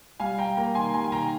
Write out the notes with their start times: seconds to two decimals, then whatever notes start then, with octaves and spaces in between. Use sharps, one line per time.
0.20 G3 F5 G#5
0.38 G3 G5 A#5
0.57 A#3 G5 A#5
0.75 D#3 G#5 C6
0.94 G3 G#5 C6
1.04 G#5
1.12 D#3 G5 A#5